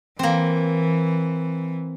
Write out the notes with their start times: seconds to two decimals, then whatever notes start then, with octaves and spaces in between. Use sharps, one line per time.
0.19 E3 A#3 C4